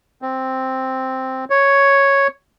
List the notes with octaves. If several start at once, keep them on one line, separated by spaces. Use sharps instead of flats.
C4
C#5